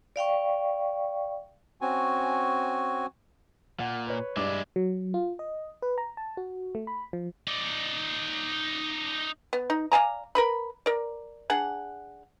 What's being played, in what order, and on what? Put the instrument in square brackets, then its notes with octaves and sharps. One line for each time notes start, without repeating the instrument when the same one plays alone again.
[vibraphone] D5 F5 G5 C#6
[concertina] C4 C#4 F#4 G#5
[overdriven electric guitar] A#2 [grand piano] F#5
[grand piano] B4 C#5
[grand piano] G2 D5 D6 [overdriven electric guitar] G#3 E4
[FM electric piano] F#3
F4
D#5
B4
A#5
A5
F#4
A3
B5
F3
[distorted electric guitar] D#4 D5
[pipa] B3
D#4
D5 F5 G#5 A#5
A#4 B4 B5
A#4 D5
D4 G#4 F#5